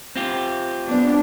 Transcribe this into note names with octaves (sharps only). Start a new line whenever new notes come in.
C4 F4 G4
B3 D4